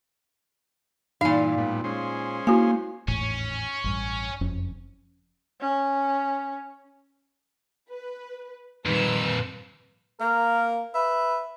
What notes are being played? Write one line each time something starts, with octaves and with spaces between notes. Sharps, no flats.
G2 A#2 E3 D#4 F5
A2 G3 B3
G#3 C#4 C5
A#3 E4 F#4 G#5
G#1 E2 A2 C#4
A1 G2
F#1 F2 C#4
C#4
B4
F2 A#2 D#3 G3 B4 E6
A#3 A#4
B4 E5